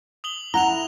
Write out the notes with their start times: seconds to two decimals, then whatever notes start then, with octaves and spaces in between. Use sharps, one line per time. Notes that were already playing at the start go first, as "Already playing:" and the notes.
0.24 D#6 F#7 G7
0.54 E4 F#5 A#5 F7 G7